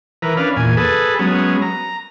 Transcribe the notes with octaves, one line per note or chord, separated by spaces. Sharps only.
E3 A#4 B4
C#4 D4 B4 F5
E2 A#2 G#5
G#4 A4 B4
F#3 G#3 B3 C#4
A#5